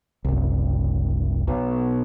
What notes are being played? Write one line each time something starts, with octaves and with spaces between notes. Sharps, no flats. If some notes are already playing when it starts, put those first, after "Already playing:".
F#1 C2
B1 B2